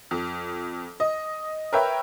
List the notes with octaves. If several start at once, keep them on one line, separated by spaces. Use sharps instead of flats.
F2
D#5
A#4 B4 C#5 E5 G5